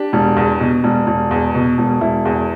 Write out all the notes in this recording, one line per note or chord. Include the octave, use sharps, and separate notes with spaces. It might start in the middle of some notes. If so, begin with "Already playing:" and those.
Already playing: D4 G4
E1
E2
B2
E1
E1
E2
B2
E1
E1 E4
E2